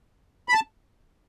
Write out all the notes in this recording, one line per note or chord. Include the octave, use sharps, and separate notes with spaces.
B5
A5